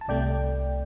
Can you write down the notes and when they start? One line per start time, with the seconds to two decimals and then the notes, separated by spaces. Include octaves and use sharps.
0.01 A5
0.08 C2 C3 A3 D5 G5